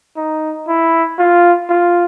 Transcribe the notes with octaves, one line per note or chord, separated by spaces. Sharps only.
D#4
E4
F4
F4